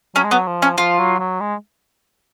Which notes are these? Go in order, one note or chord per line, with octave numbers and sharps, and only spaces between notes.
F#3 C#4
G#3
F#3 B3
F3
C#4
F3 F4
F#3
F#3
G#3